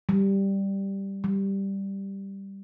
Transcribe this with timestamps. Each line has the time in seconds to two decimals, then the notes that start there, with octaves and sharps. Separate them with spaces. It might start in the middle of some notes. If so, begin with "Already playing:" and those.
0.09 G3
1.24 G3